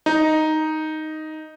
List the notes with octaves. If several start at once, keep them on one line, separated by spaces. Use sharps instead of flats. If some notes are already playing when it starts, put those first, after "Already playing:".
D#4